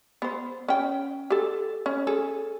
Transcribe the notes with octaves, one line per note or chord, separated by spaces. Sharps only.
B3 C5
C#4 G5
G4 A4
C#4
G#4 A4